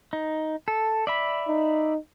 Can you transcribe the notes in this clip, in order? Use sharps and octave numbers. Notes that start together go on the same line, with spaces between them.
D#4
A4
D5 E5 B5
D#4